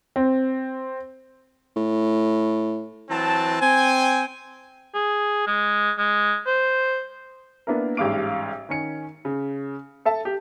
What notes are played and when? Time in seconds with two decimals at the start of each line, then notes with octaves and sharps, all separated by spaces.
0.16 C4
1.76 A2
3.10 E3 F#3 C4 A5
3.61 C4 G5 G#5
4.94 G#4
5.47 G#3
5.98 G#3
6.46 C5
7.67 A#3 B3 D4 E4 A#4
7.97 A1 G#2 G3 F5 D6 D7
8.69 D#3 C#4 C#7
9.25 C#3
10.05 A4 E5 A5
10.25 G4